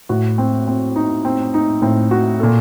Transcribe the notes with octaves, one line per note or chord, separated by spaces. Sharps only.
A2 F#4
C4
C4
D#4
C4
D#4
A2 C4
F#4
A#2 A4